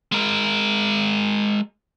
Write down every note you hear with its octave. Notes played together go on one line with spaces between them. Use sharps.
G#3 A#4